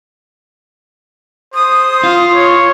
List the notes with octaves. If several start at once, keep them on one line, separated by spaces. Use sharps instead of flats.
C5 D#6
F4
C#5